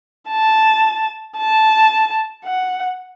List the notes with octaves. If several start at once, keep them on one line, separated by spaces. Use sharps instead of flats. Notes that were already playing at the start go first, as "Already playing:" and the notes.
A5
A5
F#5